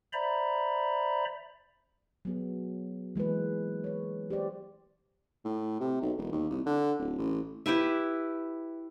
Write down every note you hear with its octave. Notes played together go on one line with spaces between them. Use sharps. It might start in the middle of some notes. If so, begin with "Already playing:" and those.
C5 D5 E5 A#5 B5
F#3 B3 G#4
E3 G#3 A#3 B4
B4 C#5
G4 C5 D5
A2
C3
B1
E1
D#2
C2
D3
D1
A1
E4 G4 B4 E5